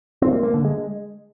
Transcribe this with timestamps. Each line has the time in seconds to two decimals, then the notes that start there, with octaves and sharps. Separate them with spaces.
0.22 C4
0.33 A#3
0.43 A#3
0.54 D3
0.65 G#3